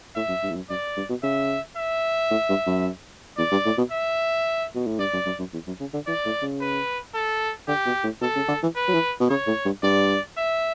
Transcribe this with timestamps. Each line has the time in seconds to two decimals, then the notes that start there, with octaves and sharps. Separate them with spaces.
0.15 A2 E5
0.28 F#2
0.43 G2
0.50 E2
0.55 F#2
0.69 F#2 D5
0.97 G2
1.09 B2
1.23 C#3 E5
1.77 E5
2.31 A2
2.49 G2
2.67 F#2
3.38 E2 D5
3.51 G2
3.65 A2
3.78 B2
3.91 E5
4.75 B2
4.87 A2
4.99 G2 D5
5.13 F#2
5.26 F#2
5.39 F#2
5.53 E2
5.67 F#2
5.80 C#3
5.94 D3
6.07 E3 D5
6.25 A2
6.42 C#3
6.60 B4
7.14 A4
7.68 D3 G4
7.86 B2
8.04 A2
8.21 B2 A4
8.36 C#3
8.48 D3
8.63 E3
8.75 B4
8.88 F#3
8.94 E3
9.20 B2
9.29 C#3 C#5
9.47 A2
9.65 G2
9.83 G2 D5
10.37 E5